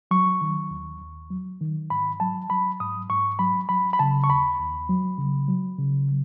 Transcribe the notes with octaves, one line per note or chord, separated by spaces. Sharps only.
F#3 C#6
D#3
D#2
D#2
F#3
D#3
G#2 B5
F#3 A5
F#3 B5
G#2 D#6
G#2 C#6
F#3 B5
F#3 B5
B5
C#3 A5
C#6
D#2 B5
D#2
F#3
C#3
F#3
C#3